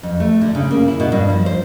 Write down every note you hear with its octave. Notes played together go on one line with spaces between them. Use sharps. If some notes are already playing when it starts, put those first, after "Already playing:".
F2
A3
D3
C#3
A#3
E4
B2
G2
F3
C5